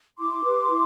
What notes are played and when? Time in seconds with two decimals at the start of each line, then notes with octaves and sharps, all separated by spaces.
0.18 E4 C6 D6
0.44 G4 B4
0.70 E4